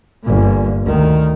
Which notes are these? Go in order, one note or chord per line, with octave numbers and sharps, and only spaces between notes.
G1 A#2
D2 D#3